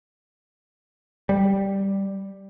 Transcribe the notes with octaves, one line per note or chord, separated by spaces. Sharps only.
G3